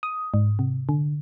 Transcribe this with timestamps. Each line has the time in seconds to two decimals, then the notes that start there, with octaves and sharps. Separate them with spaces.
0.03 D#6
0.34 G#2
0.59 C3
0.89 D3